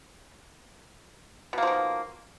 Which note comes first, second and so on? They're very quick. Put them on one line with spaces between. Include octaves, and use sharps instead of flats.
B2 A#3 F3 D#3